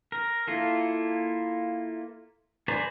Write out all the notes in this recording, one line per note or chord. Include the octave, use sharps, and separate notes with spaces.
A#4
A#3 E4 F4 A4
B4 C5 D5 G#5 A#5